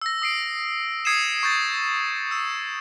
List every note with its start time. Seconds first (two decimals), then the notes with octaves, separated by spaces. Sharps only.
0.02 E6 A#6
0.22 D#6 C7 D7
1.05 D#6 G#6 C7 C#7 D#7 E7
1.43 C#6 G6 A6
2.31 E6 E7